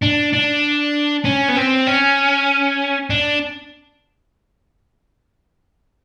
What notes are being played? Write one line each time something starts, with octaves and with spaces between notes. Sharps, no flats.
D4
D4
C#4
B3
C4
C#4
D4